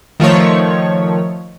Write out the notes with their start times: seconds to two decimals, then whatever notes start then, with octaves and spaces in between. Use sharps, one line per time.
0.20 D#3 F3 A3 C#5